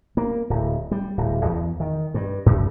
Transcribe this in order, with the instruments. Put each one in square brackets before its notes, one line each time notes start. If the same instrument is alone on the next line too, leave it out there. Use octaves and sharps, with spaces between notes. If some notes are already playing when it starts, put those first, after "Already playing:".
[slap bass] A#3
D1
G3
D1
E2
D#3
G2
F#2